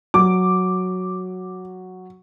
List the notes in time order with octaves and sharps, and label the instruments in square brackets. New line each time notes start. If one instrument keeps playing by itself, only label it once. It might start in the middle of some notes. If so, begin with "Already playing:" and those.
[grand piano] F#3 [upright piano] D6